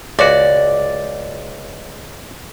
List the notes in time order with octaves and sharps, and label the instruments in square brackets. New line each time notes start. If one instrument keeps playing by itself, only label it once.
[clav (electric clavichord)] C#2 F#4 [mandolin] D5